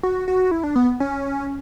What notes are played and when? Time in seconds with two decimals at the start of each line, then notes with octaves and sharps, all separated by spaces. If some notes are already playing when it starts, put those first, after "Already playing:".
0.03 F#4
0.28 F#4
0.51 E4
0.63 D4
0.75 B3
1.00 C#4